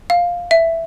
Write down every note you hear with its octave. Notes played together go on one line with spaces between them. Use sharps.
F5
E5